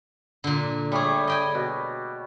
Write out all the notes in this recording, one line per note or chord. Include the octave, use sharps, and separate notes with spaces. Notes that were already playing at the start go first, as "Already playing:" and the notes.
A#2 D3
G3 A3 G#4 C#5
D#5 G5 G#5
B2